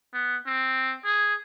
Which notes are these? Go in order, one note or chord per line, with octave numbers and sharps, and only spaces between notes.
B3
C4
G#4